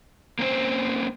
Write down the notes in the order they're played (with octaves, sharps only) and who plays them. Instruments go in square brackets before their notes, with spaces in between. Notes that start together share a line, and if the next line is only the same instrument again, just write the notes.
[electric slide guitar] A#3 C4 C#4 C5